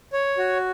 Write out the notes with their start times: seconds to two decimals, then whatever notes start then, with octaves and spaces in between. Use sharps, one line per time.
0.13 C#5
0.38 F#4